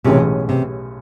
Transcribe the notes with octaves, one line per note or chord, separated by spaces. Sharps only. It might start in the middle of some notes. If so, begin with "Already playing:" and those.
B1 A2 C3 E3 G#3 C#4
C3